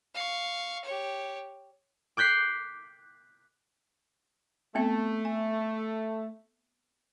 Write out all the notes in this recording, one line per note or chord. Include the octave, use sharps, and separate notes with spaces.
F5 C#6
G4 C#5
D6 F#6 G6 B6 C7
A3 B3 C4 E5
G#5